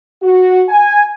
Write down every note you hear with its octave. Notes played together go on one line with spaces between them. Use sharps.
F#4
G#5